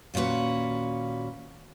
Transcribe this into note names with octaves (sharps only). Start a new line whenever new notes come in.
D#2 A#2 C#4 F#4 B4